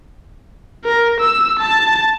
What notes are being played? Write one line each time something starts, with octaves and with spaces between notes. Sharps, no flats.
A#4
E6
A5